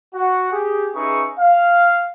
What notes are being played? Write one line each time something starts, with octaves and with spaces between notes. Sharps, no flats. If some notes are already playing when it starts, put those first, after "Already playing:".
F#4 F#5
G4 G#4
C#4 D#4 G#4 B4 E5 C#6
F5